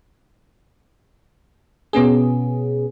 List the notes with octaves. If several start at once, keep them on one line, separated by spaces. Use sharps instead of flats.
B2 B3 C#4 G#4